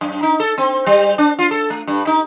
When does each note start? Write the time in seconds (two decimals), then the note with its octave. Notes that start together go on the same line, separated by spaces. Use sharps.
0.01 F#2
0.23 D#4
0.40 A4
0.58 C4
0.86 G3
1.18 D4
1.39 F4
1.51 A4
1.70 A3
1.87 G2
2.07 D#4